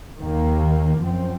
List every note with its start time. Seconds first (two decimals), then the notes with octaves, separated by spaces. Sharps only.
0.18 D#2 D#3 A#3
1.00 F#2 F3 C4